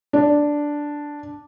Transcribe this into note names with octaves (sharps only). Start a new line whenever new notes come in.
D4